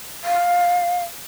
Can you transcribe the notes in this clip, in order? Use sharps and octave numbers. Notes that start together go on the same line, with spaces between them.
F5